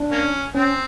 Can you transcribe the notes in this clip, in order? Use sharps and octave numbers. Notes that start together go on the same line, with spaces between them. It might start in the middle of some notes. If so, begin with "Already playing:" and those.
Already playing: D4
A#3 C#4
C4 C#4